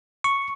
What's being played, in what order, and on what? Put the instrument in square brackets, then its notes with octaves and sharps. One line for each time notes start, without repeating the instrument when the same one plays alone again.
[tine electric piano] C#6